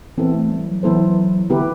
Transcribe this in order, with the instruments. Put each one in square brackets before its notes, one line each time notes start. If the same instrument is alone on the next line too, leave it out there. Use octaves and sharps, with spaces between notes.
[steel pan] E3 B3 E4 A4 C5 [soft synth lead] C4
[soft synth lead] A3
G3
F#3
[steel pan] E3 B3 E4 A4 C5
[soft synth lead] D3 [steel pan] B3 E4 G4 B4